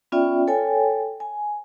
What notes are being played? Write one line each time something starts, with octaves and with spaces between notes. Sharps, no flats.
B3 C#4 F4 D5 E5 G5
A4 C#5 G5 G#5
G#5